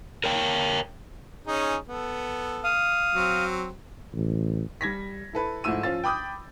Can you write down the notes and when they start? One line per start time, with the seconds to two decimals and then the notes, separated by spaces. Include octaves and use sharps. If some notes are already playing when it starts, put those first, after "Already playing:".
0.24 A#4 C#5 G5
1.47 C#4 D#4 G#4
1.88 B3 A4
2.64 F5 D#6
3.14 F#3 C4
4.14 A1
4.81 G3 G#6 A#6 B6
5.33 E4 A4 B4
5.64 G#2 F3 A3 E4 E6 D#7
5.83 F3 C#4 F4 A6
6.04 G5 B5 D6 D#6 G6